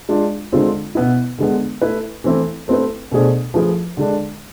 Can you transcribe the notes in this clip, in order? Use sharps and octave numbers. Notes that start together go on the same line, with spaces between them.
G#3 D4 F4
D3 G#3 C4 F4 G#4
B2 B3 E4
D3 G#3 B3
A3 E4 B4
E3 A3 C4 E4
A3 C4 E4 B4
B2 A3 D4 G#4 C5
F3 A3 E4 G#4 B4
D3 G#3 D4